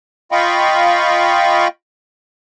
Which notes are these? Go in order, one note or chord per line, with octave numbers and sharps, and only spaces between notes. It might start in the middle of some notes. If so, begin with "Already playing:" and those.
F4 D#5 F5 G5 B5 C#6